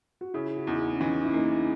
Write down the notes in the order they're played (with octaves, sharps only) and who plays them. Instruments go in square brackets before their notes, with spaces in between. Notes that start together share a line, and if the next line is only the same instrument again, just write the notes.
[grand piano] F#4
[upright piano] C#3 [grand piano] E4
[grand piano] F#4
[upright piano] E2 [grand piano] D#4
[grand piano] E4
C#4
[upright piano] E3 [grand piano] D#4
[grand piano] E4
[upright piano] A#3 [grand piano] D#4